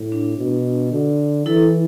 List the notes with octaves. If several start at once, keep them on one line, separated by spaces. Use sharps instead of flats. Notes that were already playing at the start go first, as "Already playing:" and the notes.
Already playing: A2
D4
B2
D3
E3 E4 A4